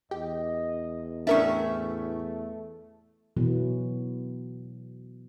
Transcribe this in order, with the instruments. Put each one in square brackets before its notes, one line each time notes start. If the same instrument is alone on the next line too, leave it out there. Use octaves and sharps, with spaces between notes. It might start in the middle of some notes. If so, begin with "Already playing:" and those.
[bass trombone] E2 [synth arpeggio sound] G4 [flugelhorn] D#5
[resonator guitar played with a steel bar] A2 C#4 E5 [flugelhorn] A3 [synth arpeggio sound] D4 A#4 C#6
[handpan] B2 E3 F#3 B3